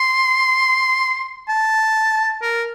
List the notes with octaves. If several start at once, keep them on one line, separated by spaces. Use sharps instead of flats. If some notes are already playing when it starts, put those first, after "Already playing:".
Already playing: C6
A5
A#4